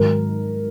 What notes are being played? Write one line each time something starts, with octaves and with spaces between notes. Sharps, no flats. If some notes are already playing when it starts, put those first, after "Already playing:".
Already playing: G#2 D#3 F#3 A#4